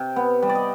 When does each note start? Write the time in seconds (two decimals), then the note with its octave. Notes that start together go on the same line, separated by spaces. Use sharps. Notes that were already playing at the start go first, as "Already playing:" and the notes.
Already playing: C3 G5
0.16 B3
0.43 G3
0.49 D5
0.55 D#5